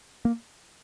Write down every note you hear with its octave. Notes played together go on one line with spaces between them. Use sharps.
A#3